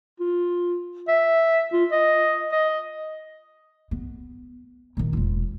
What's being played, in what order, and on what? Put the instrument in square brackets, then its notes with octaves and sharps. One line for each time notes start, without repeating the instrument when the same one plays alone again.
[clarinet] F4
E5
F4
D#5
D#5
[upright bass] B3
A#2 D#3
E1 F4